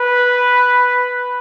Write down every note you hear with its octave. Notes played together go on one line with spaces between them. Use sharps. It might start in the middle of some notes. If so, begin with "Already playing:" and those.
Already playing: B4